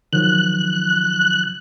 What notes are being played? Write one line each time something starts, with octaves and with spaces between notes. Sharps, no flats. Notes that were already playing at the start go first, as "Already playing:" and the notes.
D#3 F3 F#3 F#6